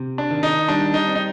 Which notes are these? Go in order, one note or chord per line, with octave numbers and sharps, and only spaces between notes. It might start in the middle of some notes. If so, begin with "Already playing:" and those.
Already playing: C3
D4
D#3
D#4
G3 D4
D#4
C4
D#4